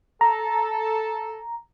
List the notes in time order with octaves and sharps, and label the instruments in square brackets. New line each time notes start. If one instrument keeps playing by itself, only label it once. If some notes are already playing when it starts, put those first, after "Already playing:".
[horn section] A4 [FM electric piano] A#5